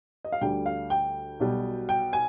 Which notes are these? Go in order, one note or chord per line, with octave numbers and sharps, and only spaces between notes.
D#5
F5
D2 D3 G3 G5
F5
G5
B1 B2 G3
G5
G#5